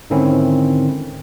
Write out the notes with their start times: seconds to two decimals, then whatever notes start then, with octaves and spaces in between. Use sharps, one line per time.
0.10 G#2 D3 D#3 C4 C#4 E4